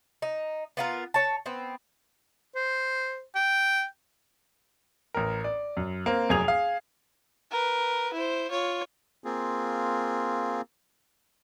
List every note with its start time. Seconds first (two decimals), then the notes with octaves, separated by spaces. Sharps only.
0.22 D#4
0.77 B3 F4 A#4
1.14 C#5 A5
1.46 B3 C4
2.55 C5
3.35 G5
5.14 A1 A#4
5.44 D5
5.77 F#2
6.06 A#3 C4
6.29 F1 F#2 G#4 G#6 F7
6.44 G#4 F5
7.52 A#4 B4
8.14 E4 C5
8.51 F4 C#5
9.24 A#3 C4 F4 G#4